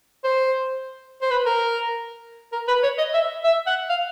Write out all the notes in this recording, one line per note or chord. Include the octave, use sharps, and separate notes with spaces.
C5
C5
B4
A#4
A#4
B4
C#5
D#5
E5
E5
F#5
F5